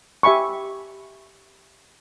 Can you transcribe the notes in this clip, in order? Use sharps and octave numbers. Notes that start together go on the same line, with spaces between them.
G4 E5 G#5 B5 C#6